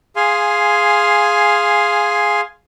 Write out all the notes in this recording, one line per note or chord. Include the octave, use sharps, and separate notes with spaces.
G#4 F5 G#5 C6